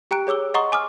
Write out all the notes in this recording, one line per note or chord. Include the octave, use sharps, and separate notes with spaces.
G4 G5 A#5 F#6 D7
G#4 C#5 D6 E6 G7
D#5 F#5 A#5 C6 C#6 D#6
G#5 D6 D#6 F6